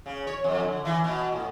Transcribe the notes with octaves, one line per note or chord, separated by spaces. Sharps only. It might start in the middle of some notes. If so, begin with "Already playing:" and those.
C#3
C#5
F2
D3
E3
B2
A2